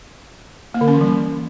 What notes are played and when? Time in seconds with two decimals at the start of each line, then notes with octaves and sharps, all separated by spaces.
0.74 A#3
0.81 D3
0.88 C#4
0.94 E3
1.01 G3